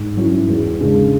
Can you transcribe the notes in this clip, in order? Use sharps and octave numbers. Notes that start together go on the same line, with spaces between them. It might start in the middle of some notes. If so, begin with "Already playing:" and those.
Already playing: G#2
F#3 C#4 E4
E2
C#3 G#3 D4